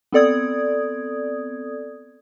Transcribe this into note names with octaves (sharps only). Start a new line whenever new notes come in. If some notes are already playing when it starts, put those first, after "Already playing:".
B3 C4 A4 D5 D#6 G#6